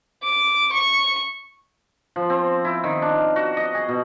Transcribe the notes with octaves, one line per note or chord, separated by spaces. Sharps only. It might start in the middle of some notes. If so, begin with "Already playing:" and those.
D6
C#6
F3
C4
E4
D#3
D4
F5
F#4
D#5
G#4
B2